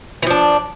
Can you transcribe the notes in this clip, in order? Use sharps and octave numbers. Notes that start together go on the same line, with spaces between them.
E3 F3 D4